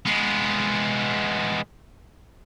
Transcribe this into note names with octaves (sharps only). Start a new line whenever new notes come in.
G#3 B3